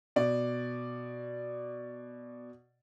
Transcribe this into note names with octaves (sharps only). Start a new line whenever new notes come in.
B2 D5